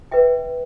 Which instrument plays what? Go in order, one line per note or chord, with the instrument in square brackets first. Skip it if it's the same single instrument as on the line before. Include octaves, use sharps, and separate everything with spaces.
[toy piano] B4 E5 G5